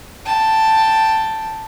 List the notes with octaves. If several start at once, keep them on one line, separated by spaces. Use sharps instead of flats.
G5 A5